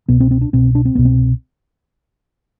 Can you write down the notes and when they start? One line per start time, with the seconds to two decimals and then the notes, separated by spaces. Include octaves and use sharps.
0.08 C2 B2 B3
0.20 C4
0.31 C4
0.41 D4
0.53 C2 B2 C4
0.75 D4
0.85 C4
0.95 C2 B2 B3
1.05 C4